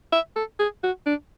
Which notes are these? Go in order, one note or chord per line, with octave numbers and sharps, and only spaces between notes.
E5
A4
G#4
F#4
D4